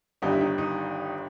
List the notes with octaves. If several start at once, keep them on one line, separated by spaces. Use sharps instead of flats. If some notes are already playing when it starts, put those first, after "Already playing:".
G1 G2 D#3 G3 D#4
E4
D#4
D#4